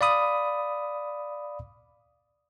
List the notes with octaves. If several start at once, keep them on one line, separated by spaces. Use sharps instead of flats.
D5 F5 B5 D#6